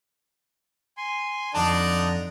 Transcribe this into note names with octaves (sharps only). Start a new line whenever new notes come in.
G#5 C6
F2 D3 D4 D#4 A5 A#5 F#6